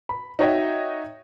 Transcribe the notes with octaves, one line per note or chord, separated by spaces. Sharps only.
B5
D#4 F#4 C#5 D#5 E5 G5